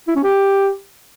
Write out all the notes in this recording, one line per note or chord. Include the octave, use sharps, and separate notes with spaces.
E4
C#4
G4